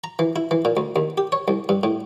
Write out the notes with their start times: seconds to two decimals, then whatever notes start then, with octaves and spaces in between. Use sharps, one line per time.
0.04 A#5
0.19 E3
0.36 E4
0.51 E3
0.65 A#2
0.77 D2
0.96 D#2
1.18 G4
1.32 C#5
1.48 C2
1.69 G2
1.83 A2